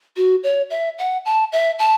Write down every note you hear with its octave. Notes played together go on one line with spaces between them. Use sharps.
F#4
C#5
E5
F#5
A5
E5
A5